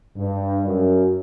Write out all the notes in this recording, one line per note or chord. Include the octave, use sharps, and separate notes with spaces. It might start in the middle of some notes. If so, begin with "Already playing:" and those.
G2
F#2